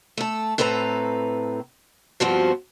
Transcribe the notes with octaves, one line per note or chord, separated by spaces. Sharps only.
A3 A4
A2 C4 A4 B4 A#5
G2 F3 B3 C4 F#4